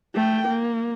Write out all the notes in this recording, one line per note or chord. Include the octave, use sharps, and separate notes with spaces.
A3 G5
A#3